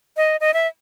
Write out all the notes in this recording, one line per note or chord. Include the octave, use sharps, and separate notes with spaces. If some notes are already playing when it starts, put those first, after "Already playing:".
D#5
D#5
E5